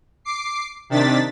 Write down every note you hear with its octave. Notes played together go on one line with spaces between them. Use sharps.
D6 C7
C3 D#3 D4 A6 B6